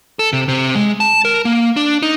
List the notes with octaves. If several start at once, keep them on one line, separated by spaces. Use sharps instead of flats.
A4
C3
C3
G#3
A5
A#4
A#3
D4
D#4